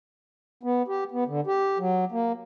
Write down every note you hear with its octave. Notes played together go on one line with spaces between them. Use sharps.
B3
G4
B3
D3
G4
F#3
A#3